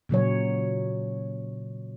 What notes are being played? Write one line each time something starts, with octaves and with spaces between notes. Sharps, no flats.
A#2 C#3 F#3 C#5